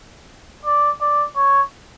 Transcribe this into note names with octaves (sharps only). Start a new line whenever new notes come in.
D5
D5
C#5